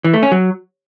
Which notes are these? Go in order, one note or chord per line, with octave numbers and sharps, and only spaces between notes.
E3
A3
C#4
F#3